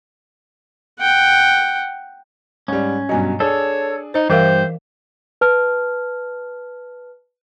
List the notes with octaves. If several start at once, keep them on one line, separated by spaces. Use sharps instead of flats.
F#5 G5
G#2 G3 C#4
G2 B2 F#3 D#5 G#5
D4 G#4 A4 C#5
D#4 C5 D#5
G2 E3 G4 A#4 C5 E5 F5
B4 A5 F6